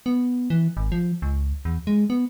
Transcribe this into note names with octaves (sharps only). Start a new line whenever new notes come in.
B3
E3
G#1
F3
C#2
E2
G#3
B3